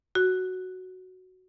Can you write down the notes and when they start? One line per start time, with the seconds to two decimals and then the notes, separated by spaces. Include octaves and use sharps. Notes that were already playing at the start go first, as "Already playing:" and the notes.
0.15 F#4